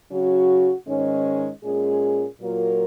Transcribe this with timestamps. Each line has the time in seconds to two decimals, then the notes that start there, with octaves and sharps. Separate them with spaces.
0.11 C#3 F#3 C#4 F#4
0.87 G#2 D#3 G#3 C#4
1.64 A#2 G#3 C#4 G#4
2.41 A#2 F#3 A#3 F4 A#4